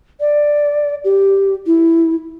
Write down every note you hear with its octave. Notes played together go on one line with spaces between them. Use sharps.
D5
G4
E4